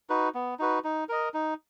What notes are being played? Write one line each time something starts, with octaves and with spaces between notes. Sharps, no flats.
D#4 F#4 B4
B3
D#4 F#4 B4
D#4
A#4 D#5
D#4